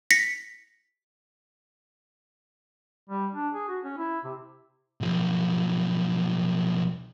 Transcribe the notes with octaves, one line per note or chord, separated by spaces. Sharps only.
A#6 B6 C#7
G3
D4
G#4
F#4
C#4
E4
C3
B1 F3